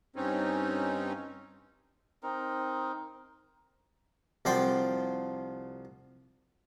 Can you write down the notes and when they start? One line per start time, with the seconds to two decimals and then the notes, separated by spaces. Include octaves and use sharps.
0.16 G2 C4 C#4 D#4
2.23 C4 D#4 A#4
4.45 C2 F3 F#4 D5 G5 C6